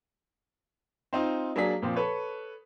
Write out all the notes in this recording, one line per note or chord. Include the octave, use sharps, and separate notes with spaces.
C4 D#4 F4
F#3 A#3 D4 G#4 D5 B6
A#2 F3 C4
A4 B4 C#5